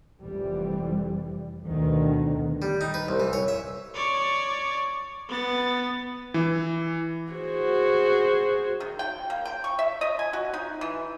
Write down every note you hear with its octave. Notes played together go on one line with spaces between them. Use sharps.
F1 E3 G3
D2 B2 D3 D#3
G3
D#4
B4
C2
E3
C#5
E5
C#5 D5
B3 A6
E3
F#4 G#4 C5
D#3
G5
A#3
G5
C#6
E5
D#5
G#5
F#4
D#4
E3